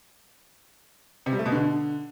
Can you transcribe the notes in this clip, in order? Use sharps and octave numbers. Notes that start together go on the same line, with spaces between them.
C3
G3
A3
B2
D3